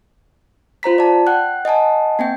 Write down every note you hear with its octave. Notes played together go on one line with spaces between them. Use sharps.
F4 C5 A#5 B6
D5 A5
F#5 G5 F#6
D#5 F#5 G#5 A5
A#3 C4 G5